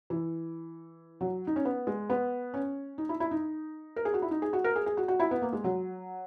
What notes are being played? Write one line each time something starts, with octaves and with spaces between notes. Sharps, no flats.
E3
F#3
D#4
C#4
B3
G#3
B3
C#4
D#4
E4
E4
D#4
A#4
G#4
F#4
E4
D#4
G#4
F#4
A#4
G#4
G#4
F#4
F#4
E4
B3
A#3
G#3
F#3